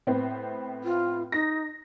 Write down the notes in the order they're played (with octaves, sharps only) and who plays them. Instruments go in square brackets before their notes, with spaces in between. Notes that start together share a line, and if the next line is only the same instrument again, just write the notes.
[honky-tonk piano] A2 B3 C4
[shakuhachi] F4
[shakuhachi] D#4 [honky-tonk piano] A#6